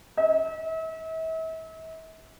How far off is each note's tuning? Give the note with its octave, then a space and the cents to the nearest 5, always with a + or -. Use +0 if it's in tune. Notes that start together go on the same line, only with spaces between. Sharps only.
E5 -40